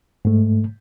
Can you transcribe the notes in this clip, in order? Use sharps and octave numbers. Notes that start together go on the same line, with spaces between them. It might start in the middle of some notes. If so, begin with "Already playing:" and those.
G#2 A3